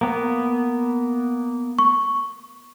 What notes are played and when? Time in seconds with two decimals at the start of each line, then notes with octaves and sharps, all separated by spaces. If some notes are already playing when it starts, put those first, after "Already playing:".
0.01 A#3 B3
1.79 C#6